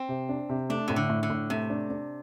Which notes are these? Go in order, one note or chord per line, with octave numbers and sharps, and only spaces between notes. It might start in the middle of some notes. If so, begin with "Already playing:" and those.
Already playing: C4
C3
D4
C3
A3 D4
A2 C3
D3
A2
D3
A2
C3 A3
D4
D4